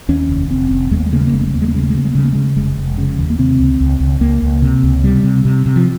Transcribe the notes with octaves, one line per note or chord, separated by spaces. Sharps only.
D#2 C#4
F1
F1 C4
F1
D#2 G#3
A#3
G#3
C#3 A#3
G#3
A#3
F1 G#3
A#3
G#3
D#2 A#3
G#3
A#3
C#3 G#3
A#3
G#3
C#3 A#3
G#3
A#3
C#3 G#3
A#3
C#3 G#3
F1 G#3
F1
C#3
D#2
A#3
C3 C4
C#2
C#2
C#2
C#2 A#3
C#2
C3
C#2
C3 G3
C3
C3
C3
F3